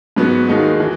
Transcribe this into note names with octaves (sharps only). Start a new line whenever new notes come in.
G#2 F#3 B3 F#4
D#2 D#3 G#3 D#4 F#4
E3